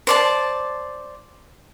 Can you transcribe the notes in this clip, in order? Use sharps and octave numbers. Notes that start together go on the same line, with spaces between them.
C5 D5 A5